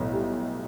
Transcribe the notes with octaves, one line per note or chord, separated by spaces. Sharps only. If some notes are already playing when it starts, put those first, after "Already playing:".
Already playing: B1 A2 E3
G3